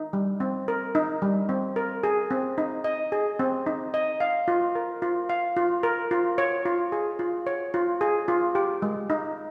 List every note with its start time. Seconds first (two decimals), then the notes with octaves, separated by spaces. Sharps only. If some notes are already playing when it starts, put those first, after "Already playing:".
Already playing: D#4
0.13 G3
0.40 C4
0.68 A#4
0.95 D#4
1.22 G3
1.49 C4
1.76 A#4
2.03 G#4
2.31 C4
2.58 D#4
2.84 D#5
3.12 G#4
3.39 C4
3.66 D#4
3.94 D#5
4.20 F5
4.48 F4
4.75 A#4
5.02 F4
5.29 F5
5.57 F4
5.83 A#4
6.11 F4
6.38 C#5
6.66 F4
6.92 G#4
7.19 F4
7.47 C#5
7.74 F4
8.01 G#4
8.28 F4
8.55 G4
8.82 G#3
9.10 D#4